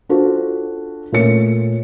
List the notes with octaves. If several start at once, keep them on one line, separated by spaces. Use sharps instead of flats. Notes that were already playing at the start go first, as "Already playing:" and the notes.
D4 F4 F#4 A4 C5
A#2 A3 C#5 C#7